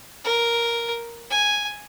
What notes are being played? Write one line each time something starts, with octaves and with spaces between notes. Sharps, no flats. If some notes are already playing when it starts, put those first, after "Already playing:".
A#4
G#5